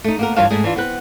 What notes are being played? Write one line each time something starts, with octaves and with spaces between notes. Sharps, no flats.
A3 D#4
A#3 B3 A#4
G2 E3 F4 C#5 F5 A5
G#2 A3 G#4
E3 D4 F4
B3 C4 B4